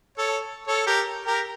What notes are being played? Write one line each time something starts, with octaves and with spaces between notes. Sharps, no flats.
A4 C#5
A4 C#5
G4 A#4
G4 A#4